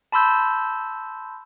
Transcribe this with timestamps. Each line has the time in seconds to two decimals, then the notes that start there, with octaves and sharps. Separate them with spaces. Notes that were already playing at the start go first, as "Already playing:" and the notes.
0.12 A5 B5 C6 E6 G6